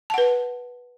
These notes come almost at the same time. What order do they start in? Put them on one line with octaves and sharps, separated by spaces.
A5 F#5 B4